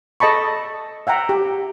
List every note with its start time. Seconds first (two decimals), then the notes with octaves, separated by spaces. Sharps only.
0.20 A4 D#5 A5 B5 C#6
1.07 E5 F#5 G5 A#5
1.29 G4